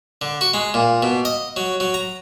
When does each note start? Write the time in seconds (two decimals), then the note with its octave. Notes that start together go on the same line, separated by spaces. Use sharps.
0.21 D3
0.41 F#4
0.54 G#3
0.74 A#2
1.03 B2
1.25 D#5
1.56 F#3
1.80 F#3
1.94 A#5